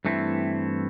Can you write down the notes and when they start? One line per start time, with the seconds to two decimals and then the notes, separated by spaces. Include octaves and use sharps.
0.05 G2 E3 A3 C4 E4